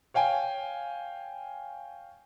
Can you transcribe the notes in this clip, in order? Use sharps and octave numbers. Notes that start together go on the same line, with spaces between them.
C#5 F5 G5 G#5